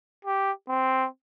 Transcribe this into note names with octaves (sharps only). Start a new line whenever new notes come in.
G4
C4